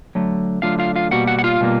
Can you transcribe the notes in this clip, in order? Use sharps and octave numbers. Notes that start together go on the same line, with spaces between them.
D3 F#3 A3
D3 F#3 A3 F4 F5
F4 F5
F4 F5
B2 G3 A#3 F#4 F#5
F#4 F#5
F#5
F4 F5
B2 G3 A#3